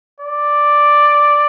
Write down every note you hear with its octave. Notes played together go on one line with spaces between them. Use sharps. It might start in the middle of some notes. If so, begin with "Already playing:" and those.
D5